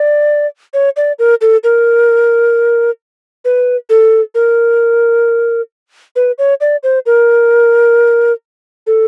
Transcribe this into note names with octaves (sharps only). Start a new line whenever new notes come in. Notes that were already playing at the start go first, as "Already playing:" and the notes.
Already playing: D5
C#5
D5
A#4
A4
A#4
B4
A4
A#4
B4
C#5
D5
C5
A#4
A4